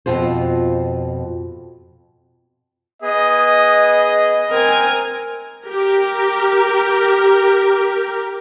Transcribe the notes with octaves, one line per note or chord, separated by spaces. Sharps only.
F2 B2 F4 C5
B3 G#4 D#5
C4 A#4 G#5
G4 A#4